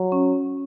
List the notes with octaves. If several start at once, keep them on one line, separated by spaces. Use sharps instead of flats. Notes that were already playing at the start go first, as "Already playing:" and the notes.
Already playing: F#3
C#4